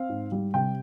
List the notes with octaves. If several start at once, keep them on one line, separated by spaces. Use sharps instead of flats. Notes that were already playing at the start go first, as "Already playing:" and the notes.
Already playing: C4 F5
G#2
G3
C3 G5